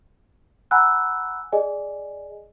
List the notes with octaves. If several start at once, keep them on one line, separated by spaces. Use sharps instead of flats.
F#5 G#5 A#5 B5 E6 F#6
G#4 D5 D#5 G#5